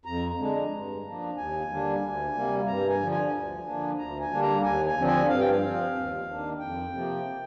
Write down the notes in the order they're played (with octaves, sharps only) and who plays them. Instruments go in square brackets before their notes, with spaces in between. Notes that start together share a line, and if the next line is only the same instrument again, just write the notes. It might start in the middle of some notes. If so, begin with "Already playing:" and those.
[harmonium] F2 A#5
D3 G#3 D4
G2
F3 A#3 D4
D#2 G#5
D3 G3 A#3 D4
D2
C3 G3 A#3
G2 A#5
G#5
D3 F3
G#5
D2
D3 F3 A#3 D4
D2 A#5
G#5
D3 G3 A#3 D4
A#5
D#2 G#5
G#5
D3 F3 C4
G#5
G2 F5
G5
F5
F3 C4
D#2
D#3 A#3 D4
F2 G5
C3 F3 A#3